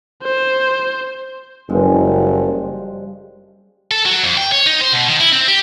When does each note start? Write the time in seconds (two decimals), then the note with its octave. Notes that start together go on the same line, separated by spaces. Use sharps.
0.23 C5
1.70 F#1 G2 F3 G#3
3.91 A4
4.06 F#3
4.24 F2
4.37 G5
4.52 C#5
4.66 D#4
4.81 C5
4.92 B2
5.08 D#3
5.21 E4
5.33 C4
5.48 G4